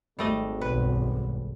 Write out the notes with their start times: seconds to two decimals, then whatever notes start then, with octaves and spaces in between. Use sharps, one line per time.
0.19 G#1 G3 A3 D#5
0.61 B1 G2 B4